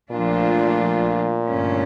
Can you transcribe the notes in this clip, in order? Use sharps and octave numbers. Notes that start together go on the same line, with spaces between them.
A#2 F3 A3 D4 F4
G2 D3 A3 C#4